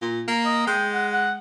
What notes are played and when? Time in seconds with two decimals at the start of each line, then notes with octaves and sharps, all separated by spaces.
0.02 A#2
0.28 A#3
0.45 D#5
0.67 G#3 G5
0.93 F#5
1.12 F#5